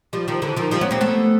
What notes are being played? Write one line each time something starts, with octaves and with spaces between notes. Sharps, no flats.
F3 G3
D#3 F3
D3 E3
D#3 F3
F3 G3
B3 C#4
A#3 C4
A3 B3